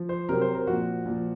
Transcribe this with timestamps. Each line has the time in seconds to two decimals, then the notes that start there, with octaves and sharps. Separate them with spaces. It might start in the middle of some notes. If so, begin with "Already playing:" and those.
Already playing: F3
0.09 C5
0.29 C3 F#3 A#4
0.41 C5
0.55 A#4
0.67 A#2 F3 F#4
1.06 A#2 F3